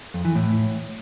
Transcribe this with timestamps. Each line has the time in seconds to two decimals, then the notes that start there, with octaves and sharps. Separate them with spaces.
0.14 F2
0.25 E3
0.35 A2